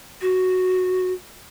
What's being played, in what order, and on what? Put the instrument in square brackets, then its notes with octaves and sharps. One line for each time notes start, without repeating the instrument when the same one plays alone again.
[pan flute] F#4